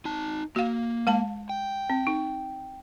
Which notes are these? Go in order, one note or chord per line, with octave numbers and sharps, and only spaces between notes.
D#4 A5
A#3 F#4 F5
G#3 F5 A5
G5
C4
D#4